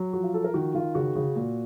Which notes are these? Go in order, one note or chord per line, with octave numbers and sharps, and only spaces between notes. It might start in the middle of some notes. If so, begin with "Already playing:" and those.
Already playing: F#3
F3 F#4
F4
F3 A4
A#4
D#3 F#4
D#3 F4
C#3 F#4
C#3
A#2